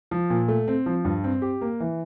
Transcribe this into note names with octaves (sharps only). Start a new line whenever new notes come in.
F3
A#2
A3
C4
F3
G2
C4
G4
A#3
E3